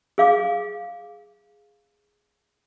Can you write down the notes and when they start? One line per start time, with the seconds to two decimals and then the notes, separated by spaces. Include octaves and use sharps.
0.18 G#4 F5 D6